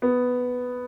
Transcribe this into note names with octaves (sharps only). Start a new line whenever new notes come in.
B3